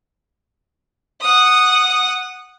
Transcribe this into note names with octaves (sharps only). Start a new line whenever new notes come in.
F#5 D#6